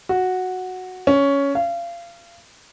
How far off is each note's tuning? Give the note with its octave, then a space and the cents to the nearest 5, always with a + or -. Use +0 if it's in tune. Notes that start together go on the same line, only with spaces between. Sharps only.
F#4 -5
C#4 +10
F5 -30